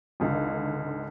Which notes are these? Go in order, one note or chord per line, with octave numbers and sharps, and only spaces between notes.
G#1 C#2 D3